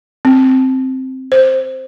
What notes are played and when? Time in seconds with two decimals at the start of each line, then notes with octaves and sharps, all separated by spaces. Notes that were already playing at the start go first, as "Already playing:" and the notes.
0.25 C4
1.32 C5